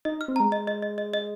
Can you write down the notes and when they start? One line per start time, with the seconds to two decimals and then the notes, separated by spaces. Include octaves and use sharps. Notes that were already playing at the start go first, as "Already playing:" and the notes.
0.05 D#4 D#5
0.21 F6
0.28 C4
0.36 G#3 A#5
0.52 D#5
0.67 D#5
0.82 D#5
0.98 D#5
1.14 D#5